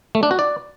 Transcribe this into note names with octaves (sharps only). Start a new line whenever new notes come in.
A3
D4
F#4
D5